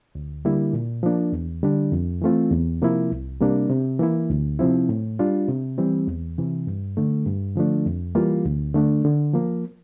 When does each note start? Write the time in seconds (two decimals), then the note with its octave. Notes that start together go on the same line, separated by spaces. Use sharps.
0.15 D2
0.45 D3 G3 A#3 E4
0.73 A#2
1.03 F3 A#3 D4
1.33 E2
1.63 D3 G3 D4
1.92 F2
2.22 E3 A3 C4 F4
2.51 E2
2.82 C3 F3 A#3 E4
3.12 C2
3.41 C3 G3 A#3 D4
3.70 C3
4.00 E3 A#3 E4
4.30 D2
4.59 C3 F3 C4 E4
4.89 A2
5.19 G3 D4 F4
5.48 C3
5.78 E3 G3 C4
6.07 E2
6.38 C3 E3
6.67 G2
6.97 D3 A3
7.26 G2
7.56 D3 F3 A3 D4
7.86 F2
8.15 E3 G3 A#3 F4
8.45 D2
8.74 D3 A3 D4
9.05 D3
9.34 F3 A#3